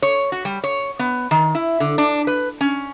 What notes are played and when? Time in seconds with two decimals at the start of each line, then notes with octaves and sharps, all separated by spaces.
0.02 C#5
0.32 F#4
0.45 G3
0.64 C#5
0.99 B3
1.31 D#3
1.55 E4
1.80 D3
1.98 D4
2.27 B4
2.61 C#4